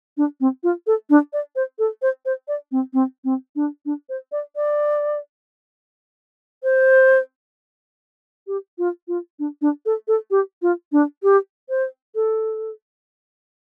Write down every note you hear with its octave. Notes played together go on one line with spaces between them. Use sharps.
D4
C4
F4
A4
D4
D5
C5
A4
C5
C5
D5
C4
C4
C4
D4
D4
C5
D5
D5
C5
G4
F4
F4
D4
D4
A4
A4
G4
F4
D4
G4
C5
A4